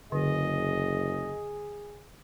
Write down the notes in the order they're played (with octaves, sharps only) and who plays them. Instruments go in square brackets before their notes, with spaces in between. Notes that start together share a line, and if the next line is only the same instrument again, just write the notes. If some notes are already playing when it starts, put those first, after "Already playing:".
[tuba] F#1 [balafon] D3 [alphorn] G#4 [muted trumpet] D#5